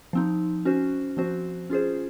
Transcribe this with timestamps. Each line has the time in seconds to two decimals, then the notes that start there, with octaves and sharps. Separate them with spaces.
0.13 F3 C4 D#4
0.65 C#4 F#4 C5
1.17 F3 C4 F#4 C5
1.70 C#4 F4 G#4 C5